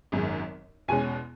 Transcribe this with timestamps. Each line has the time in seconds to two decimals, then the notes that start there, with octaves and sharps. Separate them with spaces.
0.12 G#1 F#2 D#3 G#3
0.88 E2 B2 G#3 C#4 G#5